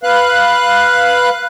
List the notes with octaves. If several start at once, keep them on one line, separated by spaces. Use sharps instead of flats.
B4 F5 F#6